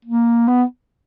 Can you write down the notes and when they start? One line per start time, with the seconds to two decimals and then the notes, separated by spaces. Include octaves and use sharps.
0.05 A#3
0.48 B3